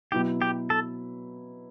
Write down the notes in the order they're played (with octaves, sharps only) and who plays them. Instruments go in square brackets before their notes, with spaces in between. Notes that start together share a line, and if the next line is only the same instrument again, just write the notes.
[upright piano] B2 F#3 B3 E4 [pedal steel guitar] G4
[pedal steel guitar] G4
A4